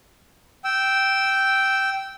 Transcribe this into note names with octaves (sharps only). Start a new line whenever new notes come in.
G5 E6